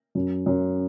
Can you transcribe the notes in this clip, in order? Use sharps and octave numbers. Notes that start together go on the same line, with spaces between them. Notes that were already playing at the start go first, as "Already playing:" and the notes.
F#2
F#2